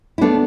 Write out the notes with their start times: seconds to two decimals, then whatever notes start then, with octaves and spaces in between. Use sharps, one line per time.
0.18 E4
0.21 A3 B3 D4